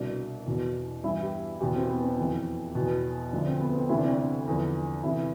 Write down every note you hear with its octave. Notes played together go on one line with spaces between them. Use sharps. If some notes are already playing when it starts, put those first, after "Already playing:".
Already playing: C2 B2 D4
E2 B2
G2 E3 E4
G4
E2 B2 G4
C4
B3
C4
F2 E3
E2 B2
D2 D3 F3 D4
C4
B3
C4
D2 C3 E3 E4
D4
C4
D4
E2 D3 F3
E2 C3 E3 E4